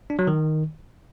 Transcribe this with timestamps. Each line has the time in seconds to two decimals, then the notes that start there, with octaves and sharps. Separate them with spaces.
0.10 D4
0.19 F#3
0.27 D#3